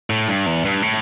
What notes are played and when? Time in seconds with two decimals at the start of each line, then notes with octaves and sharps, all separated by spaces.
0.10 A2
0.28 G2
0.46 E2
0.65 G2
0.82 A2